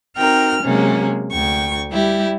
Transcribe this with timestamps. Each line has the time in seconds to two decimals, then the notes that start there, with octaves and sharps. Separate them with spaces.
0.17 C4 D#4 F#4 A#4 G5 F6
0.64 C3 F#3 G#3 A#3 C#4
1.31 D2 G5 C#6
1.91 G3 E4 G4